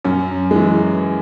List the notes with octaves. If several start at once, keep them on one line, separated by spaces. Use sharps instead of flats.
F#2 C#4
E3 G#3